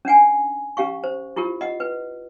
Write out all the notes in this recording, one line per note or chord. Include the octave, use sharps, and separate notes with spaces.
C#4 D4 F#5 G#5
C#4 G4 F5 C#6
C5
E4 F4 G4 A#4
D#5 F#5
B4